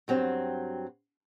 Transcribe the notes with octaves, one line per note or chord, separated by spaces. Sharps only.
G2 F#3 C4